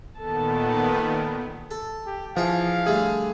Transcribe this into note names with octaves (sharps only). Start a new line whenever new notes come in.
A#2 D#3 B3 A4 A5
A4
G4
E3 F3 G#4 F5
D3 G3 A3 G#4